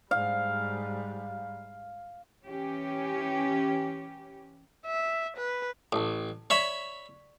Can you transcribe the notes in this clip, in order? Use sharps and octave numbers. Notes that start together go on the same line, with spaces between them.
G#2 G3 F5
E3 C#4 G4
E5
B4
A1 A4 A5
C#5 D5 E5 B5 C#6